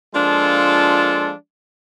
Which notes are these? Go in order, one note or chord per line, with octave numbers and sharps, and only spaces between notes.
F3 G#3 A#3 D4 F4 A4